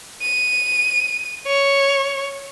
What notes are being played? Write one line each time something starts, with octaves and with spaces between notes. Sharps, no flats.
D#7
C#5